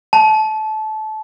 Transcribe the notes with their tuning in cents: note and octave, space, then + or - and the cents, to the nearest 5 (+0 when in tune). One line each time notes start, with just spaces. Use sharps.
A5 -25